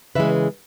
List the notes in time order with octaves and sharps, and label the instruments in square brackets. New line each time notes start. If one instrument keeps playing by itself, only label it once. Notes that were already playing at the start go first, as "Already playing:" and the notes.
[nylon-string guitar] C#3 E3 G#3 B4 E5